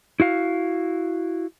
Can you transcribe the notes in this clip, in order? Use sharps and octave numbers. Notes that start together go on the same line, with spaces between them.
E4 F#4 F5